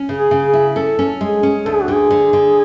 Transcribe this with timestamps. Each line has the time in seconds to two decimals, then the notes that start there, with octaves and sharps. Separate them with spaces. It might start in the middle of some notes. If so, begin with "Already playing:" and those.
Already playing: C#4
0.09 C#3
0.17 G#4
0.31 C#3
0.47 G#4
0.53 E4
0.76 C#4 A4
0.99 C#4
1.21 G#3 G#4
1.43 C#4
1.66 D2 A4
1.75 G#4
1.82 F#4
1.88 D3 G#4
2.11 D3
2.33 D3